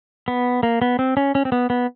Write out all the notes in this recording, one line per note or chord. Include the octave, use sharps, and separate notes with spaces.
B3
A#3
B3
C4
C#4
C#4
C4
B3
B3